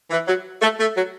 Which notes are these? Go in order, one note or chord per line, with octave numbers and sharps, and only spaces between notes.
E3
F#3
A3
A3
F#3